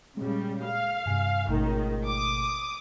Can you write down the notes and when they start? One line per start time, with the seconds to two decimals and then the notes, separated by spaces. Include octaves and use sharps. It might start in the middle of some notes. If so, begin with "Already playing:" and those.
0.17 A#2 C#3 G3 G#3
0.65 F5
1.06 G2 C3 G#5
1.48 G#1 C#2 B2 D#3 A3
2.07 D6 D#6